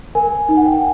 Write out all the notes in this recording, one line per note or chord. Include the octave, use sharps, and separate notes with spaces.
A#4 G#5
D#4
F#5
G5
G#5